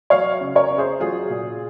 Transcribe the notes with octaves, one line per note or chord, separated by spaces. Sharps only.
F#3 C#5 F5
C#3
A#4 C#5
C#3
G#4 C5
F#3 F4 G#4
A#2